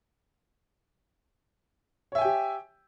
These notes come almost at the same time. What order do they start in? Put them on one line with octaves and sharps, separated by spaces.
C#5 E5 G#5 G5 G4